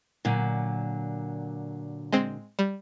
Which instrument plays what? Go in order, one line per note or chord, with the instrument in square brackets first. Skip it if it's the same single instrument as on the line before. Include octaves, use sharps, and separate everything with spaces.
[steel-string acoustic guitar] A#2 D3 F#3
[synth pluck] G#3 C4
G3